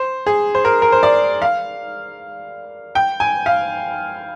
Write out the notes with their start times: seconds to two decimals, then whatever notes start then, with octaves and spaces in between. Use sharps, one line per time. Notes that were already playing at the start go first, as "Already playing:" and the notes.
Already playing: C5
0.27 G#4
0.55 C5
0.65 A#4
0.82 A#4
0.92 C5
1.03 D5
1.42 F5
2.95 G5
3.20 G#5
3.46 F5